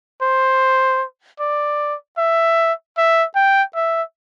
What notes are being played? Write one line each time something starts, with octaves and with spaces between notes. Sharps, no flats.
C5
D5
E5
E5
G5
E5